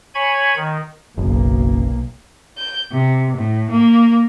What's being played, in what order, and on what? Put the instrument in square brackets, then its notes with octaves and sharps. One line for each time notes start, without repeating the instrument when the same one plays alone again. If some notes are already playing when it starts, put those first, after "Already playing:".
[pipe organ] C#5 G#5 B5 C#6 G#6
D#3
[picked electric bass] F#1 [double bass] B1 A#3
[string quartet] G6
C3
A2
A#3